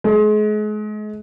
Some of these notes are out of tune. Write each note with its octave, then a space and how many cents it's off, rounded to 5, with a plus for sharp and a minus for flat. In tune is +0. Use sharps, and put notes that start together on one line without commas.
G#3 +35